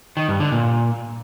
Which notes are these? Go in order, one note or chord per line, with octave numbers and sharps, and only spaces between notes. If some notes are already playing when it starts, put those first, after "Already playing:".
D#3
G2
D3
A#2